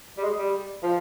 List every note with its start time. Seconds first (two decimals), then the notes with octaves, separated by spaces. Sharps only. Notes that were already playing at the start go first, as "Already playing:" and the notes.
0.17 G3
0.23 G#3
0.38 G3
0.83 F3